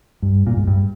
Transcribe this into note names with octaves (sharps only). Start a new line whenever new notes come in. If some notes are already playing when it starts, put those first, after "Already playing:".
G2
A#2
G#2
G2